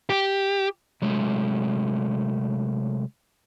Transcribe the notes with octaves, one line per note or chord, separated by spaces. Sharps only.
G4
C3 F#3 G#3 A3